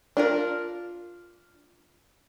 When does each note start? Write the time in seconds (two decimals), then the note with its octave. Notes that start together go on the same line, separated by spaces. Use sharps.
0.17 D4 F4 A#4